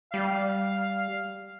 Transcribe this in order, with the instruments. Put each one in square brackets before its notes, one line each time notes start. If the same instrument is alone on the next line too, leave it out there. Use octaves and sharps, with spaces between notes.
[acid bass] G3 [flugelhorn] F5